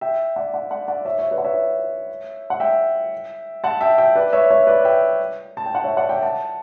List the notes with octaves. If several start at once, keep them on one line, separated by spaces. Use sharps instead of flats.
E5 G5
D5 F#5
D5 F#5
D5 F#5
D5 F#5
C#5 E5
C#5 E5
B4 D5
F#5
C#5 E5
F#5
E5 G5
F#5 A5
E5 G5
E5 G5
B4 D5
C#5 E5
C#5 E5
B4 D5
E5 G5
A5
G5
F#5
C#5 E5
D5 F#5
E5 G5
F#5 A5